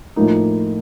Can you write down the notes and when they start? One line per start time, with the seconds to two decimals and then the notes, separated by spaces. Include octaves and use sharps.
0.16 A2 F3 A#3 D#4